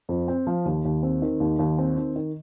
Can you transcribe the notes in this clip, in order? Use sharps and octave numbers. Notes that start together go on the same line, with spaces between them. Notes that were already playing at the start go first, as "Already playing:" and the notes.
F2
C4
F3
D#2
D#2
C4
D#3
D#2
D#2
C4
D#3
D#3